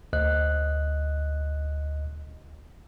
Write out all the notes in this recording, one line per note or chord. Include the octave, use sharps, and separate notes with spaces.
D2 D#5 F#6